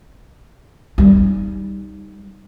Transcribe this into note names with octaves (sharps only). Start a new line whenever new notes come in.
G3 D#4